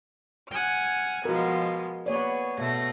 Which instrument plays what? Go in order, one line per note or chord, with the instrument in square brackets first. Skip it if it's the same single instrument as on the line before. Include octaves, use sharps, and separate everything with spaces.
[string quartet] F#5 G#5 F6
[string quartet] B2 F3 G#3 [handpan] F#4 A#4
[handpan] A#3 C#5 D5 [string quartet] B3 G#4
[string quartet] B2 A3 A#6